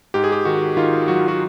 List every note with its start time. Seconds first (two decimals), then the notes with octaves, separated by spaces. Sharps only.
0.14 G#2 G4
0.24 G#4
0.32 G4
0.45 D#3 F#4
0.77 D#3 F4
1.08 F#3 F#4
1.28 F#4